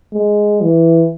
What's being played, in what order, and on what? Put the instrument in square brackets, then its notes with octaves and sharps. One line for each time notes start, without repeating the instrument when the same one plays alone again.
[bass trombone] G#3
E3